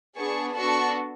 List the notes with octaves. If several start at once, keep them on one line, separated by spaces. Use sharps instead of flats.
B3 D4 G#4 A5 C#6
B3 D4 F#4 A4 A5 C#6